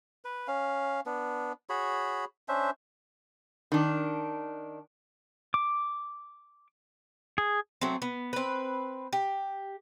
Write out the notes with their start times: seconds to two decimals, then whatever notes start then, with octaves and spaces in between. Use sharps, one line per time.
0.25 B4
0.47 C#4 F5
1.06 B3 D4
1.69 F#4 G#4 C#5 B5
2.48 C#4 D4 C5 E5
3.72 D#3 D4
5.54 D6
7.38 G#4
7.81 F#3 A3 C4
8.02 B3
8.33 C4 B4
9.13 G4